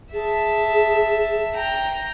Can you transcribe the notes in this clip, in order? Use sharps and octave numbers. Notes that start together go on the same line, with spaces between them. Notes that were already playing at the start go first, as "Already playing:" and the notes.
G#4 E5 A5
G5 A#5